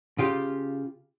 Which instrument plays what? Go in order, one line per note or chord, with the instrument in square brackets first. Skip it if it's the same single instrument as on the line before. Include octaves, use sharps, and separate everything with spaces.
[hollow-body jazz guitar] C#3 F4 G4